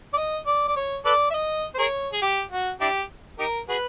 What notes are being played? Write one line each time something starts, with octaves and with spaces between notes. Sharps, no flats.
D5
D#5
D5
D5
C#5
A4 B4 D5
E5
D#5
C5
G#4 A#4 C#5
G#4
G4
F#4
D4 E4 G4
D#4 G4 A#4
F#4 G#4 B4